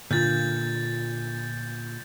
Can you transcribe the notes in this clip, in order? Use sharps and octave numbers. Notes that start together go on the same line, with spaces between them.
A#2 D3 F4 G6 A6